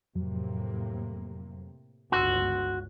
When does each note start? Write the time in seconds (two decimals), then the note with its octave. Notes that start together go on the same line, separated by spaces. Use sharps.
0.15 F2 A2 C3 F#3 A#3
2.12 G1 C#2 F#4 C6 E6